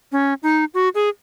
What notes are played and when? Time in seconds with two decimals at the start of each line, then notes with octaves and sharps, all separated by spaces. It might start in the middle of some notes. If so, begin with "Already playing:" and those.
0.12 C#4
0.43 D#4
0.74 F#4
0.95 G#4